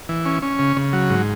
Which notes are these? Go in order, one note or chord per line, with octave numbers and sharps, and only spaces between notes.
E3
C#4
C#4
C#3
C#3
F#3
G#2